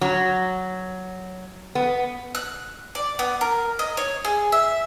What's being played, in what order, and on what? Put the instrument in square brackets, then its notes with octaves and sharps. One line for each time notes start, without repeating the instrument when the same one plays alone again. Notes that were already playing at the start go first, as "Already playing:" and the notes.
[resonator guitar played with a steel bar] F#3
B3
[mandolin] F#6
D5
B3
A#4
D#5
C#5
G#4
E5